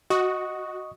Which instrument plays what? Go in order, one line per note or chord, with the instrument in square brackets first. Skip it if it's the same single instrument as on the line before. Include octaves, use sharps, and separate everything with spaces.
[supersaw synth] F#4 [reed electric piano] D#5 C#6 D#6